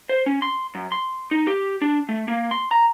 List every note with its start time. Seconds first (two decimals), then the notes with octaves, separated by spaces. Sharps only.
0.09 C5
0.26 C#4
0.42 C6
0.75 F#2
0.92 C6
1.31 D#4
1.47 G4
1.82 D4
2.09 A3
2.28 A#3
2.51 C6
2.71 A#5